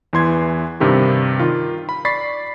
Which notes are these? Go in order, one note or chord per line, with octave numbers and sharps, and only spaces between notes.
E2 E3 C6 G#6
G2 C3 D#3 G4
D#3 F4
B5
D5 B5 C#6 A6 B6 C7